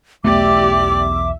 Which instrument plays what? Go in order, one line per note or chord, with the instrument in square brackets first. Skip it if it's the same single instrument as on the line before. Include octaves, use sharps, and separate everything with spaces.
[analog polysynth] B1 E2 E5 [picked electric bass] A3 B3 [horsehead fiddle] G4 D5 [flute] D6